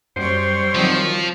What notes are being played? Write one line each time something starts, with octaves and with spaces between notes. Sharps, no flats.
F#2 G3 C5 C#5
D#3 F3 F#3 C4